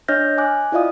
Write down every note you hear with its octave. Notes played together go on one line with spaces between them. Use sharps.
D4 C#5 D#5 F6 G6 A#6
G#5 D6 F#6
E4 F4 D5 D#5 F5 D#6